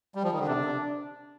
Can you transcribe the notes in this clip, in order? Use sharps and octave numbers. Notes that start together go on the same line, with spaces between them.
G3
F3
D#3
D3
C3 D4
C3